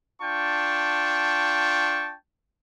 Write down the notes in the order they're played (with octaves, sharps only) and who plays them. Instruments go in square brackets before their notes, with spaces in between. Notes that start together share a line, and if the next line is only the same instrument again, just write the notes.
[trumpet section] D4 F4 G5 A5 C#6